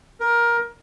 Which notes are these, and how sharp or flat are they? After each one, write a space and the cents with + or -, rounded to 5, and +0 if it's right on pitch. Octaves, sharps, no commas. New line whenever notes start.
A#4 +15